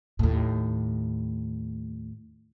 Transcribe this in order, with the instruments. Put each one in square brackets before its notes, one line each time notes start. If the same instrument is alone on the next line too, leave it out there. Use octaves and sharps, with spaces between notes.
[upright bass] D#2 A2